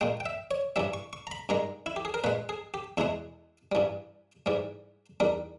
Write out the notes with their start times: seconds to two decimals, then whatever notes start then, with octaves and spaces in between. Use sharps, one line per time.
0.01 A#2 G#3 G5
0.20 G5
0.26 E5
0.51 C#5
0.76 G2 E3 G3 E5
0.94 C#6
1.13 C#6
1.27 A#5
1.31 B5
1.49 G2 D#3 G#3 A#5
1.86 E4
1.96 G4
2.05 G#4
2.14 A#4
2.24 A#2 G#3 B4
2.49 G#4
2.74 G4
2.97 E2 B2 G#3 E4
3.72 G2 E3 G3
4.46 G#2 E3 G3
5.20 E2 D#3 G3